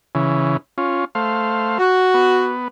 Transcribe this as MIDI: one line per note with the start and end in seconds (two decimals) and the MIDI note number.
0.15 0.57 49
0.15 0.57 52
0.78 1.05 61
0.78 1.05 65
1.15 1.78 57
1.15 1.78 72
1.15 1.78 77
1.79 2.48 66
2.14 2.68 59